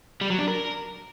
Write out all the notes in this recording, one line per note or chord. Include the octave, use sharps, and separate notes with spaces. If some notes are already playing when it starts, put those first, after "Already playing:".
G3
F#3
D4
A#4